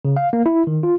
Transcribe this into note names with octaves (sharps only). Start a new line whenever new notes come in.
C#3
F5
A#3
E4
D#3
F4